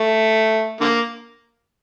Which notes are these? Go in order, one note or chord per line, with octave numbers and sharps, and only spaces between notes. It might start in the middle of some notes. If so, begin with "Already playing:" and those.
Already playing: A3
D3 A#3